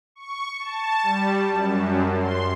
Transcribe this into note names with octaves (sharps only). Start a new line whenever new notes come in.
C#6
A5
G3
F#2
C6